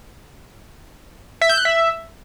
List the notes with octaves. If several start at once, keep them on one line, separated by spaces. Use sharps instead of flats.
E5
G6
F#6
E5